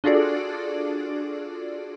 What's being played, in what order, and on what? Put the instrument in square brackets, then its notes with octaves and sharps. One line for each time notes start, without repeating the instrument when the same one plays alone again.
[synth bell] D4 F4 F#4 G#4 A4 D5